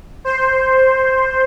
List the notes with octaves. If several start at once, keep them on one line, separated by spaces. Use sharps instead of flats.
C5